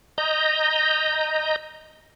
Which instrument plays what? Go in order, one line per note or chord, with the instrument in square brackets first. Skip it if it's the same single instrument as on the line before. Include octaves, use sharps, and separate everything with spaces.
[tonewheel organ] D#5 A#5 G6